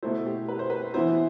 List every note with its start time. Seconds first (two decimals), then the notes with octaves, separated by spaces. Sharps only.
0.03 B2 A3 E4 C5
0.26 G4
0.48 B4
0.59 C5
0.70 B4
0.94 E3 B3 E4 C5